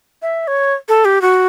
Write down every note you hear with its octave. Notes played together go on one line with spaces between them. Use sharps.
E5
C#5
A4
G4
F#4